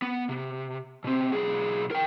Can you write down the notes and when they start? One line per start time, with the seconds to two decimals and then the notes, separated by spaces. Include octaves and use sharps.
0.02 B3
0.29 C3
1.04 B2 C4
1.32 B1 G#4
1.91 A#4 G5